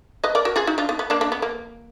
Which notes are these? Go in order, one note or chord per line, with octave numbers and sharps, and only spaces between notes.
B4 D#5
A#4 D5
F#4 A#4
F4 G#4
D#4 F#4
D4 F4
B3 D#4
B3
A#3 D4
A#3 D4
B3
A#3